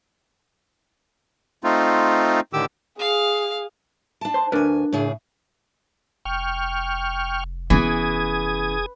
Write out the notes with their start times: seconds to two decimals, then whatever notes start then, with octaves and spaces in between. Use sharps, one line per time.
1.64 A3 C4 D#4 F4
2.53 A2 D3 D#3 G4 D6 E6
2.99 G#4 F5
4.21 D4 A5
4.34 C5 C6
4.52 D2 D4 A#4 B4 G#5
4.93 A2 C#3 G#4
6.25 F1 G5 C#6 F6
7.70 E3 B3 C#4 G#4 D#6 G#6